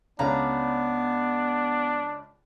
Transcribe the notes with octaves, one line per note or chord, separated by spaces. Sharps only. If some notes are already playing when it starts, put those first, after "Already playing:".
C#2 B3 C#4 D4 B4 D5 F5 A#5